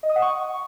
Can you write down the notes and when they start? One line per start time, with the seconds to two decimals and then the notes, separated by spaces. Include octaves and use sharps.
0.03 D#5
0.09 D#6
0.16 F#5
0.22 C#6